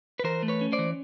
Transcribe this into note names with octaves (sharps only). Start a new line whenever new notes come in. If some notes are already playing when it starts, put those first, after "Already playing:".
B4
E3 A#4 C5
A3
B4 C#5
C#4
C5 D5
E3